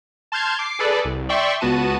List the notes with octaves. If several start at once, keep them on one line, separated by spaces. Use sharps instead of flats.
A5 C6 F6 G6 G#6
D6 C7
G#4 A4 B4 D5
C2
D5 E5 G5 C6 C#6
C#2 B3 F#4 A5 D#7